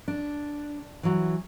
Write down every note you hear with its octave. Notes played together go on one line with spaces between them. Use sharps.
D4
E3 F#3